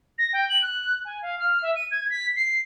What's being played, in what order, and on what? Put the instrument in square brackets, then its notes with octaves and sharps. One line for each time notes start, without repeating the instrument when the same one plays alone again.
[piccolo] A#6
G5
F#7
F#6
G#5
F5
F6
E5
D#7
G#6
B6
C7